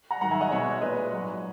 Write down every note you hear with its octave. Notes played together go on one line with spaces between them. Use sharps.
F#5 A#5
G#2 D#3 F#3 F#5 A#5
E5 G#5
D#5 F#5
B2 G#3 C#5 E5
A#2 G#3 B4 D#5
G#2 F#3